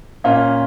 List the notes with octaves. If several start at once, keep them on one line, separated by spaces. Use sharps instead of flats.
A#2 A#3 C#4 F4